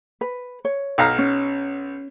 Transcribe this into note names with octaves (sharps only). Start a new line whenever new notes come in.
B4
C#5
B1 F5 A#5
C#4